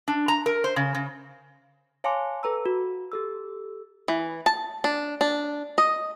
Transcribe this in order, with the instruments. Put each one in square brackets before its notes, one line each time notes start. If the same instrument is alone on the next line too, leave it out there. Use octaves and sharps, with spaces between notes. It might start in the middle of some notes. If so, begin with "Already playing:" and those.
[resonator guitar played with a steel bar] D4
A#5
A#4
C5
C#3
C#3
[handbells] C#5 F5 G#5 A5 C6 D6
A4 B4 A#5 E6
F#4
G4 A4 E6
[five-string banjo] E3
A5
D4
D4
D#5